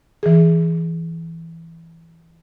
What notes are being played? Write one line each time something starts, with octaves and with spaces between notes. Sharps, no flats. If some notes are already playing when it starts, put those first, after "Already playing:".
E3 G#4